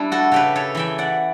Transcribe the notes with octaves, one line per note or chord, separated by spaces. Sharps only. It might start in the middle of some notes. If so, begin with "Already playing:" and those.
Already playing: G3 D4 E4
F#4 A4
C#3 G4 B4
A4 C#5
E3 E5 G5
D5 F#5